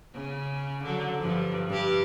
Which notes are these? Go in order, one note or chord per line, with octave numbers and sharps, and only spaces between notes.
C#3
D3 F#3
G2 F3
G2 G4